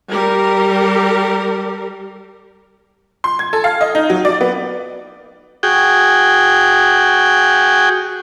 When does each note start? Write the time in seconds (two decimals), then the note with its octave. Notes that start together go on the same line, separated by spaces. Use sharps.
0.12 G3 G4 A#4
3.24 C6
3.39 G#6
3.53 A4
3.64 F5
3.81 D#5
3.95 D#4
4.10 F#3
4.25 D5
4.41 B3
5.63 F#4 G#4 G5